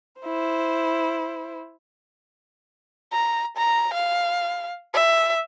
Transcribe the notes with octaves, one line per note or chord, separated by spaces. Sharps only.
E4 C5
A#5
A#5
F5
E5